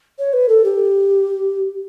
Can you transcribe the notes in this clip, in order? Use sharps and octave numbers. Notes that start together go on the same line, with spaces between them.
C#5
B4
A4
G4